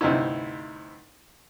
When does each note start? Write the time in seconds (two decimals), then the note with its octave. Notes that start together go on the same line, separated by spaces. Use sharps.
0.01 D2 G2 C3 D#4 E4